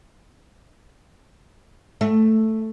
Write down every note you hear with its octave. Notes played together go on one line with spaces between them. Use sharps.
A3